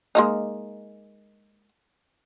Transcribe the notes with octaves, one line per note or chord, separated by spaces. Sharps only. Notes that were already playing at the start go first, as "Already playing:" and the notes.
G#3 A#3 D#4